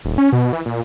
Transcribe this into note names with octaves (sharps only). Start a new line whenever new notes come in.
D#1
C#4
B2
E3
A#2